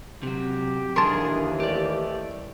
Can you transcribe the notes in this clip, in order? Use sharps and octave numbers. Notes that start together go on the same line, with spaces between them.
C3 F#3 G4
D#2 D3 E3 G#4 A#4 A5 C6
A3 G4 D5